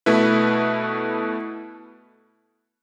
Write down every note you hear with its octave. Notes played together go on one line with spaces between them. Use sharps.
B2 A3 E4 B4